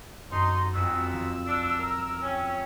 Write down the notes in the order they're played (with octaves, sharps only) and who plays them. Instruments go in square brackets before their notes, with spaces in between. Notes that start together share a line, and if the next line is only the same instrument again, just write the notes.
[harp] F#2 A4 C7 [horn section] D#4 [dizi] C6
[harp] F2 F#6 [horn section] G#2 B2 [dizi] E6
[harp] F3
[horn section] D4
A#4
[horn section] C#4 [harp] G5